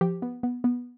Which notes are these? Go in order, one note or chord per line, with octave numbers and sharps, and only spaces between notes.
F3 G4
B3
B3
B3